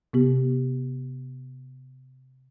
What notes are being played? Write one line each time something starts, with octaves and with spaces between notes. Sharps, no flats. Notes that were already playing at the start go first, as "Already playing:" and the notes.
C3 B3 G4